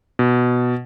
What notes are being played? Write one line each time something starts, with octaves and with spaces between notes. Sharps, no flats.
B2